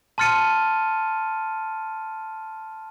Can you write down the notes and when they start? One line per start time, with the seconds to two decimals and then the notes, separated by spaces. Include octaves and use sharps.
0.18 A5 C6 F6 A6 C#7 D#7